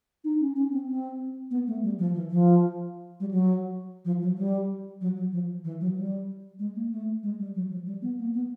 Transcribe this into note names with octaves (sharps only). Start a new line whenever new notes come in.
D#4
C#4
C#4
C4
C4
B3
A3
G3
F3
E3
F3
G3
F#3
F3
F#3
G3
F#3
F#3
F3
E3
F#3
G3
G#3
A#3
A3
G#3
G3
F#3
F3
G3
B3
A#3
B3